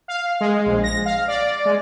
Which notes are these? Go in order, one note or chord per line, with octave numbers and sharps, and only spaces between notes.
F5
G#3
A#1
A#6
F5
D5
G#3